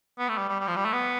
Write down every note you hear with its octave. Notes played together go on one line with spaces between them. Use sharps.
B3
A3
G3
G3
G3
F3
G3
A3
B3